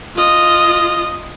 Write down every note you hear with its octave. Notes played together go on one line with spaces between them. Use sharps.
F4 D#5